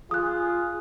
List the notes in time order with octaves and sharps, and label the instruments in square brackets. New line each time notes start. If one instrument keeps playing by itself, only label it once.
[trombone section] F4 G#4 [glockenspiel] D#6 F#6